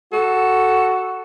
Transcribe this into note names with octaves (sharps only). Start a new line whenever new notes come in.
F#4 A4